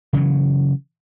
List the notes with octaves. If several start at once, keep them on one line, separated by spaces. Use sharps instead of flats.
C#3 E3 F#3